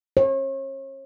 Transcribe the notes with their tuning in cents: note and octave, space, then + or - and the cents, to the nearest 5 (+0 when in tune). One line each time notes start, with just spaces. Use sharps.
C#5 -40